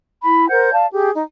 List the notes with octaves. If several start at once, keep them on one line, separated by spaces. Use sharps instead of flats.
E4 B5
A#4 C5 F#5 G6
D5 F5 A5
G4 G#4
D#4